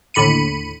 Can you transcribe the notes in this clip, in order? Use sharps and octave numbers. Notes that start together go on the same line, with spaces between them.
D#2 A2 D3 B5 C#7 D#7